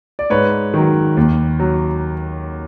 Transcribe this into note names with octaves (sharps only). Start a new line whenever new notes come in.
D5
G#2 B4 C#5
D#3 F#3
D#2
F#3